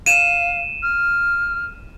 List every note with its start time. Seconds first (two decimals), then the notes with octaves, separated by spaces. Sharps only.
0.06 F5 D#7 E7
0.83 F6